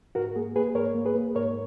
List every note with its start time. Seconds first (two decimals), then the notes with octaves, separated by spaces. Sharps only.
0.15 G#2 F#4 A#4
0.36 A#3 G#4
0.56 A#3 G#4 B4
0.75 G#2 A#4 C#5
0.95 A#3
1.05 G#4 B4
1.15 A#3
1.35 G#2 A#4 C#5